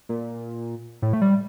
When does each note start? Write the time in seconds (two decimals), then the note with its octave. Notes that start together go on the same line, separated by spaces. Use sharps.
0.09 A#2
1.02 A2
1.13 A3
1.22 G3